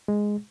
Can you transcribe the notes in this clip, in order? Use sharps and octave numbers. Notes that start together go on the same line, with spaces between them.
G#3